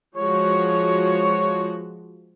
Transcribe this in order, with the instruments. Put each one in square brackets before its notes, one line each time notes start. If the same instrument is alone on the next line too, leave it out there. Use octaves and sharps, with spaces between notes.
[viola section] F3 G#3 F#4 [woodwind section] C#5